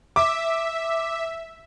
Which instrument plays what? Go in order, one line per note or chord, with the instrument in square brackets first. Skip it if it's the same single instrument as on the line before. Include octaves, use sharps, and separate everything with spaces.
[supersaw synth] E5 [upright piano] D6